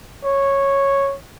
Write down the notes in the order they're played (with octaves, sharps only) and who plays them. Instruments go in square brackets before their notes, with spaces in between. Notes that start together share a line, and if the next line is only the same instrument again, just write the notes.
[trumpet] C#5